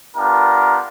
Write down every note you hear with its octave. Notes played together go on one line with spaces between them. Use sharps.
B3 D4 F4 G4 A#4